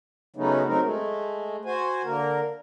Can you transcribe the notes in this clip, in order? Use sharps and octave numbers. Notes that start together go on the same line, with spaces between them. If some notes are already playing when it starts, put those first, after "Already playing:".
C#3 F#3 A3 B3 C#4 D#4
F#3 A3 C4 D#4 A#4
G#3 A3
F#4 C5 G#5
D3 A#3 A#4